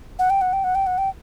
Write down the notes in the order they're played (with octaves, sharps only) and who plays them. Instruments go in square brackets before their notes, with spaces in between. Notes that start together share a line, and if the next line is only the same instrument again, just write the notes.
[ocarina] F#5
G5
F#5
G5
F#5
G5
F#5
G5